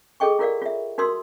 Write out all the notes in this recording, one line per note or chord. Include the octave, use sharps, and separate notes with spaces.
G#4 A4 D#5 G5 C#6
E4 F4 A#4 D5 F5
F4 E5
D#4 F#4 A#4 C6 D#6 E6